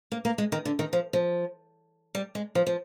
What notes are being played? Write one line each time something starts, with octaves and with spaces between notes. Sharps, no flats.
A#3
A#3
G#3
D#3
D3
D#3
F3
F3
G3
G#3
F3
F3